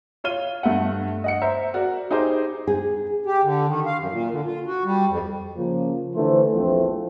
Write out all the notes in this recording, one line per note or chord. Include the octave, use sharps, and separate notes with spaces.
F4 C#5 F6 D#7 G7
G2 A3 E5 F#5
D#5 F#5 C#7
C5 E5 A#5
F#4 A#4 D5
D#4 G4 G#4 C5 D6
G#4
G4
D3
D#3
F5
F#2
A#2
D3
F4
F#4
G3
F2
C#3 F3 A#3
D3 E3 A3 C5
A#1 E2 E3 F3 A3 C4